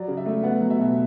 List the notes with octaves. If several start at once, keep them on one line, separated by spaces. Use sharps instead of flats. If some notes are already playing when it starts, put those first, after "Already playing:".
Already playing: F#3 D5
C#3
E5
A3
B3 F#5
F#3
E5
B2